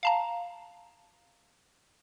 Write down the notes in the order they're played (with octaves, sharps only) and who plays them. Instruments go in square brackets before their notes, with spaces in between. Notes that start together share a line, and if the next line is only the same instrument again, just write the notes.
[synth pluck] F5 A5 A#5